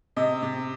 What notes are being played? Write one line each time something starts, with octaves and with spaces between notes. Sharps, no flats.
C3 D#5
C3